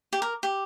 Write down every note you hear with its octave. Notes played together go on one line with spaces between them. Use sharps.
G4
A#4
G4